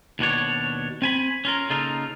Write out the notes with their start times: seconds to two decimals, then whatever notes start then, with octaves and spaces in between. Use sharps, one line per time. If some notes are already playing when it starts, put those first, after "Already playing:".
0.19 D#2 B2 D4 C#5
1.02 C4 G#5 B5
1.45 C#4 F4 A#4
1.70 C#3 A#3 D#4 F4 A4 A#4